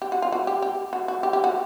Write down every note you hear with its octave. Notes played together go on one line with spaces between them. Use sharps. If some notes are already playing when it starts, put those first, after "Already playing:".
G4
F#4
F4
F#4
G4
G4
F#4
F#4
G4
G4
F#4